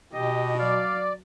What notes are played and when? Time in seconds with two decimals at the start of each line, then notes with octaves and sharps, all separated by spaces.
0.14 B2 G4 D#5
0.59 F#3 D5 F5